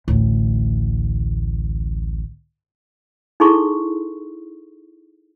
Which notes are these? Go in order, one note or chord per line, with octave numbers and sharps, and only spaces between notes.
A1 D2
D#4 E4 G#4 A4 C6 C#6